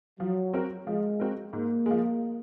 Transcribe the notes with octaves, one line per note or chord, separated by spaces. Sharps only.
F3 F#3
C4 F#4 A#4
F3 G#3
C4 F#4 A#4
G#2 A#3
F3 G#3